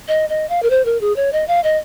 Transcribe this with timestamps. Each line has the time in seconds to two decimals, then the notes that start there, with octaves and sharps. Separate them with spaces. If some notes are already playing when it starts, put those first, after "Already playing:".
0.08 D#5
0.29 D#5
0.49 F5
0.62 A#4
0.70 C5
0.85 A#4
1.01 G#4
1.16 C#5
1.32 D#5
1.48 F5
1.64 D#5